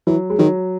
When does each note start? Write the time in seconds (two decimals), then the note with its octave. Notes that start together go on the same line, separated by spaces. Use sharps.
0.07 E3 F#3
0.30 G#3
0.39 D#3 F#3